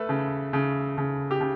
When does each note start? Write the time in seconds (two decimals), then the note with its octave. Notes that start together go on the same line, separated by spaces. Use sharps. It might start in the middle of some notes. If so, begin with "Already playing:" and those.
Already playing: A3 A4 B4
0.09 C#3
0.53 C#3
0.98 C#3
1.31 G4
1.41 C#3